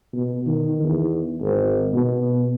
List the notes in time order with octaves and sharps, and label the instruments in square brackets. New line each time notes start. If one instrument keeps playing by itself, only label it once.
[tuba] B2
D#3
E2
G#1
B2